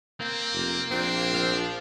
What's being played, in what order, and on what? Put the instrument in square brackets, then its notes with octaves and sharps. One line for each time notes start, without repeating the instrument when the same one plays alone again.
[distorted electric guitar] A#3 [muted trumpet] C4
[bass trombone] F1
[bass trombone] A#1 [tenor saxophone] C4 [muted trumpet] D4
[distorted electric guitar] C5 F5